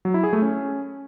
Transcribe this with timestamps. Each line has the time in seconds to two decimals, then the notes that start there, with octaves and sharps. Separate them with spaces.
0.05 F#3
0.14 E4
0.24 G#4
0.33 A3
0.42 C#4